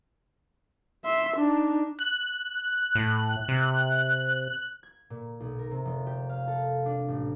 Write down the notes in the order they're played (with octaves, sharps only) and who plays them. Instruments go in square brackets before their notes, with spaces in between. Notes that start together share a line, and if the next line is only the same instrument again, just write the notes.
[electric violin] E5 C6
D4 D#4
[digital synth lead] F#6
[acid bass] A2
C3
[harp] G#6
A#2
B1
A#4
C3
F1
G4
F5
A4
D4
A1